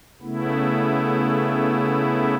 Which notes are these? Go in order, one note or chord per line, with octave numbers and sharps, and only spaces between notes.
C#3 A3 B3 E4